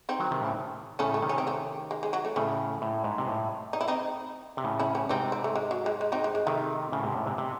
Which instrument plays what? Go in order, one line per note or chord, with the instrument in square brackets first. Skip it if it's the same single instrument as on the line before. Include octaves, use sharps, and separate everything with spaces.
[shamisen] C4 D#4
[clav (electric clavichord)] D#3 F#3
C3 D#3
A2 C#3
[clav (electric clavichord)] A2 C#3 [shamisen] A3 C#4
[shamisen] A3
[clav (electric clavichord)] C3 D#3
[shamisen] C#4
C4
A3 C#4
G#3
G#3
F#3
A3
[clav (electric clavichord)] A2 C#3 [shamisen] A3 C#4
[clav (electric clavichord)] A2
G#2
C3
A2
[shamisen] D#4
E4
C4 D#4
[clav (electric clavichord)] C3
A2 C#3
[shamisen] C#4 E4
C#4 E4
[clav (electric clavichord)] G#2 C3 [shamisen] C4 D#4
[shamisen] C4
A3
G#3
F#3
G#3
G#3
C4 D#4
G#3
G#3
[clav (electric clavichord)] C3 D#3 [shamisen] A3
[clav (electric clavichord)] A2 C#3
G#2 C3
A2
G#2 C3
C3